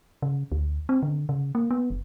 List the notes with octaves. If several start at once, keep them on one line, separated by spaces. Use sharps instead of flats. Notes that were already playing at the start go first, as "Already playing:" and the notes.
C#3
D2
C4
D3
C#3
A#3
B3
F#1